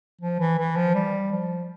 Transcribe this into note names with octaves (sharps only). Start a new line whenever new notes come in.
F3
E3
E3
F3
G3
F3